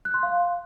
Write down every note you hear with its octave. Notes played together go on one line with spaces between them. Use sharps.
F#6
C6
F5